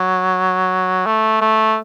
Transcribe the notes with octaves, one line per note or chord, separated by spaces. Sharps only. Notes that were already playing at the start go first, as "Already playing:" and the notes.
Already playing: F#3
A3
A3